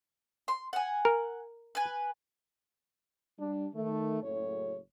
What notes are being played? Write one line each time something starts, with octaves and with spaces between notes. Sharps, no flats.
C6
F#5 G#5
A#4
B4 G#5
G3 D4
D#3 A3
F#1 A2 C#5